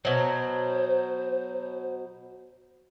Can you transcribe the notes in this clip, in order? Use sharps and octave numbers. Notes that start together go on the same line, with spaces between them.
B2 F#3 C5